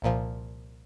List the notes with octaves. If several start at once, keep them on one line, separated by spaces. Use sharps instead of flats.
C2 A#2 F3